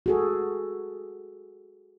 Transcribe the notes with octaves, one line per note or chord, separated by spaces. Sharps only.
F#4 G#4 A4